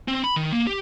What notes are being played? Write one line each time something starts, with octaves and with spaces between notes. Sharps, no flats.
C4
B5
D#3
A#3
G4